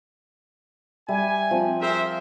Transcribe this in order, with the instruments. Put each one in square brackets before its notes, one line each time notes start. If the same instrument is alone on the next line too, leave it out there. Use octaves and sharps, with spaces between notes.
[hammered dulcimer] G3 E5 [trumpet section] G#5
[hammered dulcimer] F3 C4
[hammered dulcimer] G#4 C6 [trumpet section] A#4 C5 E5